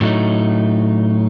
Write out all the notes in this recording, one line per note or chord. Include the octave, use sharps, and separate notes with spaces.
A2 F#3 A3 D#4